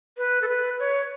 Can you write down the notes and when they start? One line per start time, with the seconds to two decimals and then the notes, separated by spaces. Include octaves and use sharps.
0.18 B4
0.42 A4
0.48 B4
0.79 C#5